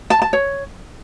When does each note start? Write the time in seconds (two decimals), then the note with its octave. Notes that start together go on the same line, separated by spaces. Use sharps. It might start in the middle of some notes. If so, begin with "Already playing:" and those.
0.10 A5
0.22 A5
0.33 C#5